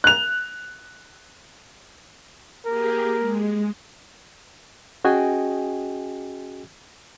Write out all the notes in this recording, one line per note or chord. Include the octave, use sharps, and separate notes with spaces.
F#6 F7
A#3 G4 G#4 A#4
G#3
C#4 F#4 G#4 D#5 G5 G#5